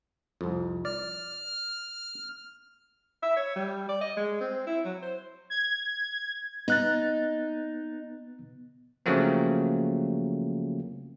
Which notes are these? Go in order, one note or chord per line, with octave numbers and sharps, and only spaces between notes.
C2 F2
D5 F6
E5
C#5
G3
D5
D#5
G#3
C4
E4
F#3
C5
G#6
B3 D#4 F#6 A6
C#3 F3 F#3 A3 A#3 C4